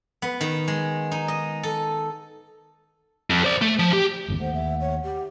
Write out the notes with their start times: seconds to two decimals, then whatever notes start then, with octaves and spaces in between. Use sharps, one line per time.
0.22 B3
0.41 D#3
0.68 G#3
1.11 D#4
1.28 D#5
1.63 A4
3.30 F2
3.44 C5 D5
3.62 A3
3.79 F3
3.93 G4
4.28 G#1 E2 D3
4.40 D#2 A3 C5 F#5
4.54 E5
4.81 C#5
5.04 G4